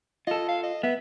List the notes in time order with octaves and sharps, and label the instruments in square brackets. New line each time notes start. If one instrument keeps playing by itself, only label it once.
[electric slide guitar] F4 A4 [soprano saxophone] D#5
[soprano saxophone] F5
D#5
[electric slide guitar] B3 [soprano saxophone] E5